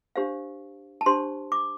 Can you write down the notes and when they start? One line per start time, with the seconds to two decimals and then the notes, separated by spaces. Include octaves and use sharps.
0.16 D4 G4 C5 F5
1.01 A5
1.06 D4 G4 C5 C6
1.52 D6